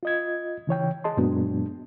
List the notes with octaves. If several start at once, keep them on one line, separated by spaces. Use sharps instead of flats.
F4 D#5 G#6
C#3 E3 C#5 G5
G#4 D#5 A5 C6
F#2 A#2 F#3 G#3 B3 D4